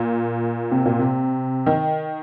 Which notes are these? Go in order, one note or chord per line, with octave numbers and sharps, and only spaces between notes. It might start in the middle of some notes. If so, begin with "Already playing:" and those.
Already playing: A#2
C3
A#2
C3
D#3